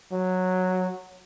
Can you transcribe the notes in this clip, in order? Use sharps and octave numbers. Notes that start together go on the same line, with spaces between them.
F#3